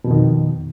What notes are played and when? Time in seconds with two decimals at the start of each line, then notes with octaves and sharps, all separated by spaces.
0.04 B2
0.08 F2
0.11 D#3